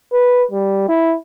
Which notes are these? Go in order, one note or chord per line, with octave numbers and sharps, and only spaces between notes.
B4
G3
E4